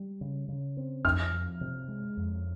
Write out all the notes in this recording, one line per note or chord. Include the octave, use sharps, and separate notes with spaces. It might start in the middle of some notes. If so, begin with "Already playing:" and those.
Already playing: G3
C#3
C#3
C4
F2 F6
F3
C3
G#3
F2